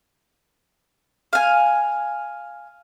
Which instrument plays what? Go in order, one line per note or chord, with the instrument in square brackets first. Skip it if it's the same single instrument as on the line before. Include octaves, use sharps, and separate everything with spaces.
[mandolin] F5 G#5